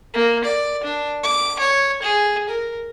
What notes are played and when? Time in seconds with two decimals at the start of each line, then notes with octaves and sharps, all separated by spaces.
0.14 A#3
0.45 D5
0.84 D4
1.24 D6
1.60 C#5
2.03 G#4
2.49 A#4